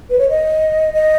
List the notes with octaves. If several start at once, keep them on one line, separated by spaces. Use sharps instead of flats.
B4
C#5
D#5
D#5